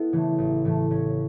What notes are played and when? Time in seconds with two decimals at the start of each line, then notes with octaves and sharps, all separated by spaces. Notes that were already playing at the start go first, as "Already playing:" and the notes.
Already playing: B3 E4 A4
0.12 C#3 E3 A3
0.38 A1
0.65 A2 E3 A3
0.90 A1 C#4